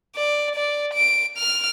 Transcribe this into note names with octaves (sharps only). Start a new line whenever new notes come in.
D5
D5
D7
F6